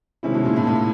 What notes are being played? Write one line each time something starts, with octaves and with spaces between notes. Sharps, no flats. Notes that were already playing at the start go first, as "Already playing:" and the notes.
C3 D#3 G#3 C#4 E4
B2
A#2
A2
A2